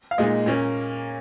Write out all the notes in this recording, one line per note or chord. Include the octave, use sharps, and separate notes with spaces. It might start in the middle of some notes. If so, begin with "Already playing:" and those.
F5
A#2 G#3 D#4 D#5
A#2 A#3 C#4